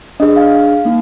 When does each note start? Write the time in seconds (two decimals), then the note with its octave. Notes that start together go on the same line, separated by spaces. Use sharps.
0.20 D4 G#4 D#5
0.36 F5
0.85 A#3 D#4